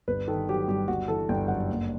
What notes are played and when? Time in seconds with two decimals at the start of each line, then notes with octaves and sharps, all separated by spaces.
0.08 G1 B4
0.28 D#3 A4
0.49 F#3 G4
0.68 G2 G4
0.88 G1 F#4
1.08 E3 A4
1.29 G1 G5
1.48 F#2 F#5
1.69 F#1